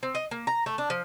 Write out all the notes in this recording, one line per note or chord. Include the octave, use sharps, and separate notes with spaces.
C4
D#5
A#3
A#5
A3
D4
F3